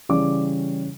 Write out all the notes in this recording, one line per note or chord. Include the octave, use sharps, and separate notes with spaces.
C#3 E3 G3 C#4 D5 D6